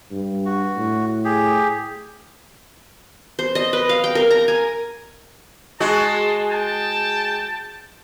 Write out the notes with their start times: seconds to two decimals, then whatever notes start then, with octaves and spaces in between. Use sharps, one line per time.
0.12 G2
0.46 F#4
0.77 A2
1.25 G4 G#4
3.39 C5
3.55 D#5
3.73 B4
3.89 F5
4.04 G5
4.15 A#4
4.31 A#5
4.48 G#5
5.80 G#3 F#4 A5 C6
6.51 G5 A5